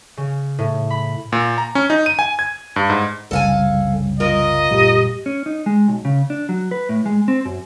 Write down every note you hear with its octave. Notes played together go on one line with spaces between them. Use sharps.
C#3
A2
B5
A#2
A#5
C#4
D#4
D#7
G#5
G#6
G2
G#2
F#1 C2 C#3 G3 A4 F5 G#5
A#3 F4 A#4 D#5
F#1 A#2 G3 G4
C#4
D#4
G#3
B1
C#3
D4
F#3
B4
A2
G#3
C4
F#2